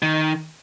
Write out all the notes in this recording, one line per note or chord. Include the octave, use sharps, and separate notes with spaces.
D#3